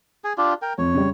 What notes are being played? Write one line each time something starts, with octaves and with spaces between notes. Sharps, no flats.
G#4 G#5
D4 F4 G4
A#4 G5
F2 C#5
C#3 G3